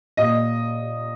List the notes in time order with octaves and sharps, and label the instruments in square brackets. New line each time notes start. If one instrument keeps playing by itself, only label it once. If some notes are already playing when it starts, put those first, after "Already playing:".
[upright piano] A#2 D#5